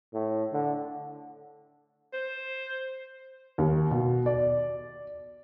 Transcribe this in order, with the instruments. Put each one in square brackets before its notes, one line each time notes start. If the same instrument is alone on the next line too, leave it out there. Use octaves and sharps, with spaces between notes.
[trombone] A2
D3
[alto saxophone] C5
[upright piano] D#2
B2
D5